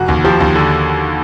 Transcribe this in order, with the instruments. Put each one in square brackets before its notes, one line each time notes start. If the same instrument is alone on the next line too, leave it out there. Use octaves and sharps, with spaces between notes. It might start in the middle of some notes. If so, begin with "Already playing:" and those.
Already playing: [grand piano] F1 [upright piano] F#4
[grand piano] D#2
[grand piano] F3 [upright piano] G4
[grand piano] D#2
D3